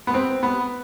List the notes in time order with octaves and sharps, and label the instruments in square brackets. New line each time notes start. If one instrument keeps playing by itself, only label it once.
[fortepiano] B3
C4
B3